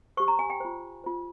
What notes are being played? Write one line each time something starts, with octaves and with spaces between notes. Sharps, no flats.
G4 C5 C#6
A#5
G#5
G5
F4 C5
F4 C5